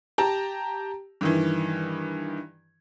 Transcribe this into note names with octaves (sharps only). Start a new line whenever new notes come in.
G4 A5 A#5
G2 D#3 E3